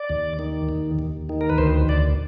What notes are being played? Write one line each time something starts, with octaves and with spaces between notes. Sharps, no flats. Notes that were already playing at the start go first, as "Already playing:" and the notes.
Already playing: D5
D#2
D#3
D#2
D#2
D#3
A#4
B4
D2 C5
D2 D5